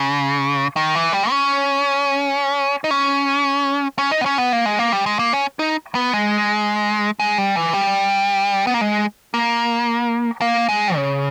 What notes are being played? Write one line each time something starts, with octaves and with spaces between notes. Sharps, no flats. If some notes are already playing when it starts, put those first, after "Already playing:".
Already playing: C#3
D#3
E3
G3
C#4
D#4
C#4
C#4
D#4
B3
C#4
B3
A#3
G#3
A#3
G3
G#3
A#3
C#4
D#4
B3
G#3
G#3
G3
E3
G3
B3
A#3
G#3
A#3
A#3
G#3
C#3